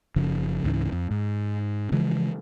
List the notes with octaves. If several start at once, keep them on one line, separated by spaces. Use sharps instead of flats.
F#1 C#3 F3
C#2 G#2 C#3 E3
F2
G#2
C#3 E3 F3 G#3